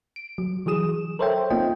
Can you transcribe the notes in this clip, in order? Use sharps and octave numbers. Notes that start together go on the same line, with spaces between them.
D7
F#3
E3 F#3 G#4 D#6 E7
A4 A#4 C5 C#5 E5 G5
A#3 C4 D#4 F4 D#5 G5